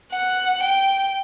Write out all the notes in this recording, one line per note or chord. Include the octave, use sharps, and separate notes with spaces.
F#5
G5